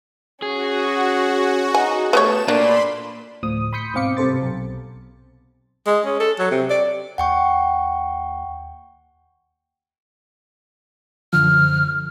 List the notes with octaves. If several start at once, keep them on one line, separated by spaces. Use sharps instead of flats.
C#4 F#4 G#4
D#4 G#5
A3 B3 G4 C#5 E7
A#2 A#3 D4 D5 B5 C6
D2 A2 F3 D#6
B5 C6 D#6 G6 B6 C#7
G#2 B2 C4 F5 D6 C#7
G2 C3 A4 C5 A6
B1
G#3
C#4
A4
F#3
C3
D5
D#2 F#5 G5 C#6
F#2 D3 F3 F6